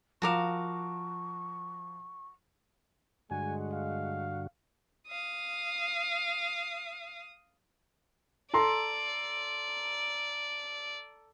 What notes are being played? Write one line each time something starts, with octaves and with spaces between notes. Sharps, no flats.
F3 F#4 A#4 F5 C#6 D6 E7
G2 D3 G#3 F#4 G#5
F5
F5 D#6
A4 D5 A#5 C6